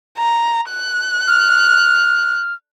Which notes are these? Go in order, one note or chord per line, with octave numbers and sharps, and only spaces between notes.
A#5
F#6
F6